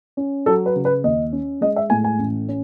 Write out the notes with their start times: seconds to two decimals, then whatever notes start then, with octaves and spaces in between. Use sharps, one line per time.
0.17 C#4
0.46 F#3 A4
0.66 B4
0.75 C#3
0.85 B4
1.04 D#2 D#5
1.32 C#4
1.61 G#3 D#5
1.76 E5
1.90 A2 G#5
2.04 G#5
2.19 A1
2.48 C#4